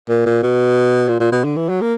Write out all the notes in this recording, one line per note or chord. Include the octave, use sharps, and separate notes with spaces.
A#2
A#2
B2
A#2
A#2
B2
D3
E3
F#3
A#3